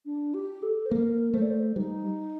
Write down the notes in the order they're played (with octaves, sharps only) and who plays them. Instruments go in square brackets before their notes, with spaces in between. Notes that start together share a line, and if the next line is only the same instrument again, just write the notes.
[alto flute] D4
G4
A4
C5
[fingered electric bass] A#3 [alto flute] A#4
[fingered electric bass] A3 [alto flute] C5
[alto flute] D5
C5
[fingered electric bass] G3 [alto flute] D#4